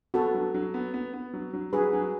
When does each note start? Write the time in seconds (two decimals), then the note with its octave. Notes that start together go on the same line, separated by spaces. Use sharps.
0.14 B3 F#4 A4
0.34 F#3
0.54 F#3
0.74 B3
0.94 B3
1.14 B3
1.34 F#3
1.53 F#3
1.73 F#3 G#4 B4
1.93 F#3